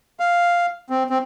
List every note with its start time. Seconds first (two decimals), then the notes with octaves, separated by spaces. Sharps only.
0.20 F5
0.90 C4
1.10 C4